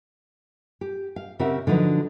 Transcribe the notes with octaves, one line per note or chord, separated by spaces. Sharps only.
G4
F5
C#3 C4 G4 A#4 E5 F#5
D3 F3 F#3 D#4 B4